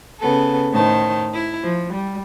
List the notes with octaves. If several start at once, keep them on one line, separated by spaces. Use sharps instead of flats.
C#3 B3 A4
A2 D#3 D#4 C5 A5
E4
F3
G3